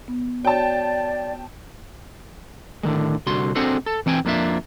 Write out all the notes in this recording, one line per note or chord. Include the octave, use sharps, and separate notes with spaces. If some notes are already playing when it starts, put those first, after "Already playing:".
B3
F#4 C#5 D5 G5 A5
A2 D3 D#3 G#3
C2 D3 F#4 C6
C4 D4 F#4 G#4 A4 C5
A4
E3 C4 G5 G#5
F2 A#3 D4 F4 E5